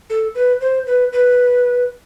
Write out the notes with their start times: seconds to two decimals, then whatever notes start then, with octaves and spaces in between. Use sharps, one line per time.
0.10 A4
0.35 B4
0.61 C5
0.87 B4
1.13 B4